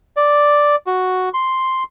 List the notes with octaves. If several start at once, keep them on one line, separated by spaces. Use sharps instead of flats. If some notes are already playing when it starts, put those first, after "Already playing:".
D5
F#4
C6